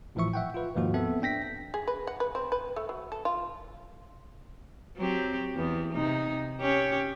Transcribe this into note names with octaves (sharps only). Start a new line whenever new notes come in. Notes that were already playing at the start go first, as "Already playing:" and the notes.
G#1 A2 E3 F3 E5 C#6
E5 F#5 G5
F4 B4
D#2 G#2 F3 A#3 F#4
B3 C4 A4 E5
D4 G5 A#6 B6
G#4
B4
F#5
B4
C4
B4
A3
F#3
A4
F4
F#3 C4 G4
E2 B3
C3 D#4
C#4 G4 C#5